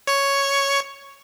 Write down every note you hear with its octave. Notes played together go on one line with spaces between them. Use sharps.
C#5 C#6